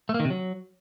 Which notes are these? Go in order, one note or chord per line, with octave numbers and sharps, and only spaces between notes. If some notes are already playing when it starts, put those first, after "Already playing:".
A3
A#3
D#3
C3
F#3